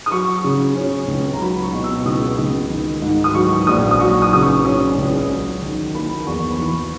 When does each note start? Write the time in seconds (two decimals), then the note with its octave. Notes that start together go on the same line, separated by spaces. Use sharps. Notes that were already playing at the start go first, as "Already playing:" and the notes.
0.06 D#6
0.11 F#3 C#6
0.44 C#3
0.75 C#4
1.08 C#2
1.33 A#5
1.40 F#3 B5
1.63 C#6
1.73 B2
1.84 E6
2.01 C#6
2.05 C#2 D#6
2.38 C#2
2.70 D#3
3.02 G#2
3.24 D#6
3.35 F#3 C#6
3.67 A#1 D#6
3.91 D#6
4.00 F#3 C#6
4.22 D#6
4.33 C#3 D#6
4.43 C#6
4.65 C#4
4.97 C#2
5.30 F#3
5.62 D#3
5.94 A#3 B5
6.27 E2 C#6
6.51 B5
6.59 E3 C#6